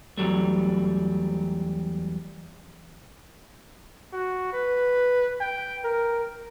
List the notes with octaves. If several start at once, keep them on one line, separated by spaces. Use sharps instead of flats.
E2 A#2 F#3 G3 A3
F#4
B4
G5
A#4